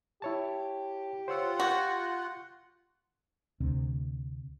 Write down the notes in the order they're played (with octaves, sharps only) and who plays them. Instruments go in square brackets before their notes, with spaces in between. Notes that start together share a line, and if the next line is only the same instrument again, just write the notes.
[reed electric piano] E4 C#5 A5 [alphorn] G4
[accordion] F4 F#5 [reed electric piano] C5 C#5 E6
[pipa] F#4 [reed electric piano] F#6 G6
[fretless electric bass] D2 C3